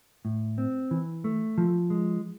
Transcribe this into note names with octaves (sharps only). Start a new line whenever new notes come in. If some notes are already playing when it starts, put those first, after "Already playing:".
A2
C4
E3
A3
F3
G#3